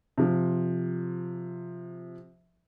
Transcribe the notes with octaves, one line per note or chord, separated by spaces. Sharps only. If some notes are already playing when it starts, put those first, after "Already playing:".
C3 F3